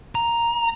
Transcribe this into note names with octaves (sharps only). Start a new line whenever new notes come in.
A#5